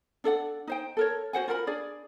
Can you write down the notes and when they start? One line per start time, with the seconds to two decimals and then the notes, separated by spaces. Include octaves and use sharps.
0.24 D4 A4 D5 F#5
0.67 D#4 C5 G5
0.97 A4 A#4 C#5
1.33 F#4 C5 F#5 G#5
1.48 F4 A4 A#4 B5
1.67 D4 G#4 D5